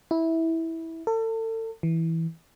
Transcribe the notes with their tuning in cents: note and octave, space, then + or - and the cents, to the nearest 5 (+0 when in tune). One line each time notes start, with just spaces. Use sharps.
E4 -15
A4 +35
E3 -10